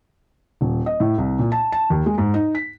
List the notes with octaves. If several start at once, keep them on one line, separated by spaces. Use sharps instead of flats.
D#1
D#5
A2
C2
A#2
A5
A5
D#2
G#3
G#2
D#4
B6